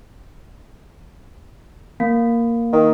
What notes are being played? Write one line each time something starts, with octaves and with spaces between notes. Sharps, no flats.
A#3
D#3